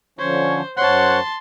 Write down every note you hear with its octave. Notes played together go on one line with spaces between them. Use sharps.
D3 F3 C#4 C5 C#5
F#2 C5 C#5 F#5 A5 C6